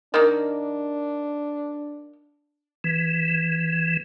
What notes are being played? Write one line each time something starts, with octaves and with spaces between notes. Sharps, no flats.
D#3 A#3 D4
E3